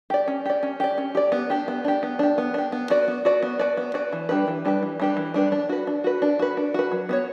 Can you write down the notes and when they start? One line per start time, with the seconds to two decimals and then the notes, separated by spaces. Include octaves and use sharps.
0.10 G4 D5
0.28 C#4
0.46 G4 D5
0.63 C#4
0.80 G4 D5
0.98 C#4
1.15 G4 D5
1.32 B3
1.50 D4 G4
1.68 B3
1.84 D4 G4
2.03 B3
2.19 D4 G4
2.38 B3
2.54 D4 G4
2.72 B3
2.90 F#4 B4 D5
3.08 B3
3.25 F#4 B4 D5
3.43 B3
3.59 F#4 B4 D5
3.77 B3
3.94 F#4 B4 D5
4.12 E3
4.29 G3 D4 G4 B4
4.47 E3
4.65 G3 D4 G4 B4
4.83 E3
5.00 G3 D4 G4 B4
5.17 E3
5.34 G3 D4 G4 B4
5.52 D4
5.69 F#4 B4
5.87 D4
6.04 F#4 B4
6.22 D4
6.39 F#4 B4
6.57 D4
6.74 F#4 B4
6.91 F#3
7.09 B3 F#4 C#5